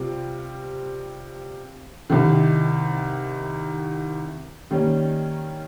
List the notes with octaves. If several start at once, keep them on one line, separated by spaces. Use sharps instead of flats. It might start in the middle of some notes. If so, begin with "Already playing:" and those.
Already playing: C3 G3 C4 F4
C2 C3 D#3
D#3 G3 A#3 C#4